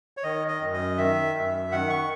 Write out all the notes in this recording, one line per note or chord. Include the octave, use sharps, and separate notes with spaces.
C#5
D#3 D#5
D#5
F#2
D#5
D#3 E5
F#2
D#3 F#5
C#6